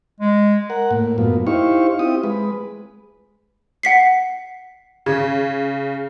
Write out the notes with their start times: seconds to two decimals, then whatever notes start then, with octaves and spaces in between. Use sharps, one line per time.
0.21 G#3
0.70 A#4 F#5
0.91 A2 A#3
1.18 F#2 A#3 B3 F4
1.47 D#4 E4 G4 C5 F5 C#6
1.99 C4 E4 F4 G4 D#6
2.24 G#3 B4
3.83 F#5 B6 C7
5.06 C#3 G#6